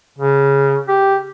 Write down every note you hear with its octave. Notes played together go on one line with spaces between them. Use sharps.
C#3
G4